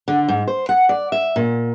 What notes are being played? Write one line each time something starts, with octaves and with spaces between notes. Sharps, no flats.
D3
G#2
C5
F#5
D5
E5
A#2